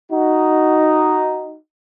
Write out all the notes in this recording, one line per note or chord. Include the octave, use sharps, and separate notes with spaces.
D#4 F#4